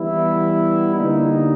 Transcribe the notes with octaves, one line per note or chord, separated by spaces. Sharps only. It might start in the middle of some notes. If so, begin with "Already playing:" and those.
Already playing: E3 G3 B3 E4
D3 G3 A#3 D#4